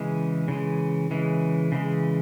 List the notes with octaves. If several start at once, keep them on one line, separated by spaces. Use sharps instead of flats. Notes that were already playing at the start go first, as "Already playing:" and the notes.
Already playing: C#3 E3 G#3
C#3 E3 G#3
C#3 E3 G#3
C#3 E3 G#3